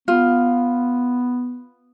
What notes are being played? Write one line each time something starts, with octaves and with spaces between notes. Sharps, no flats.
B3 F4